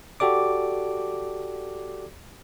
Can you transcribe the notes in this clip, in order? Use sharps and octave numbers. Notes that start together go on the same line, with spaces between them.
F#4 G4 A4 D5 D6